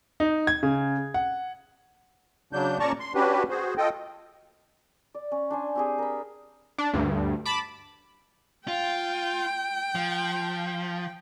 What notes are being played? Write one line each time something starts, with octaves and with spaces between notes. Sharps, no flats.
D#4
G#6
C#3
F#5
C#3 F#3 D4 G6
A#2 C#4 D5 A5 A#5 C#6
C6
C#4 D4 F#4 G4 B4
F#4 G#4 C5
F4 A4 D#5 G5
D5
C#4
D4 C5 G#5
C4 G4 G#4
A#4 B5
D4
D2 G2
A5 B5 D6
F4 G5
F3